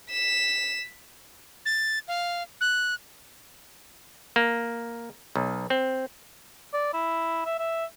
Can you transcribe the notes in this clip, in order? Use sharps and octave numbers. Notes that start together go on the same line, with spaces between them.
B6 E7
A6
F5
F#6
A#3
B1
C4
D5
E4
E5
E5